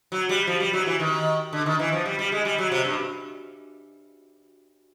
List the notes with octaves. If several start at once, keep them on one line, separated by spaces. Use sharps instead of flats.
F#3
G3
F3
G3
F#3
E3
D#3
D3
D#3
E3
F3
G3
G3
G#3
G3
F#3
C3
G2